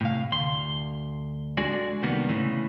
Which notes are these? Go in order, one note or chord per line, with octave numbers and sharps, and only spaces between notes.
A2 C3 F5
D2 C6
G#3 D4 F#4 G#4 A4 D5
C2 D#3 G3 A#3 B3
A2 C#3 E3 G#3